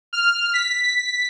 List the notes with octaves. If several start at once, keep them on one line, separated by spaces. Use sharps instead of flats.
F6
B6